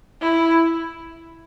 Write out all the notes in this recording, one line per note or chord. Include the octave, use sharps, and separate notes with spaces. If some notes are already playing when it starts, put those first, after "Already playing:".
E4